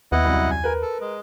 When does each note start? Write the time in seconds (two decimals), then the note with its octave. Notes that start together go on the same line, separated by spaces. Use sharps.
0.12 D#2 B3 E4 D#5 F#5
0.25 C2 F#2
0.50 G#5
0.64 A#4 B4
0.82 A4
1.01 G#3